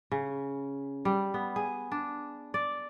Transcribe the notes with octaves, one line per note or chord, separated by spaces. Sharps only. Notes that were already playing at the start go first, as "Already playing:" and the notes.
C#3
G3
B3
G#4
D4
D5